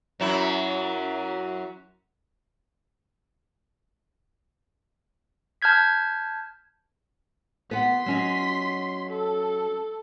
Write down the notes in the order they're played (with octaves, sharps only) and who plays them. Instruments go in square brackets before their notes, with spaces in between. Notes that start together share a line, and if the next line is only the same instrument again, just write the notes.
[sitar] F#2 F#3 E4
[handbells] A5 F6 G6 G#6 B6
[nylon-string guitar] B3 F#5 [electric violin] C6 B6
[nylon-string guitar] F#3 C#4 D#5
[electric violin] A4